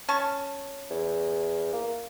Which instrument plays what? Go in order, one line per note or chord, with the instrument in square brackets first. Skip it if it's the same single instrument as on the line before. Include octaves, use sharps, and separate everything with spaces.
[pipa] C#4 A5 C#6
[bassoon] E2
A#3